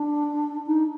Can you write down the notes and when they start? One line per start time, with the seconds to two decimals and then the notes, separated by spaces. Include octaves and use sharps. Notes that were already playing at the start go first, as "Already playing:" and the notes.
Already playing: D4
0.66 D#4